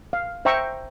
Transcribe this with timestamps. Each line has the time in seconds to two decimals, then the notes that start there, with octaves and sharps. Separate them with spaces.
0.13 F5
0.45 C5 E5 G5 A#5 C#6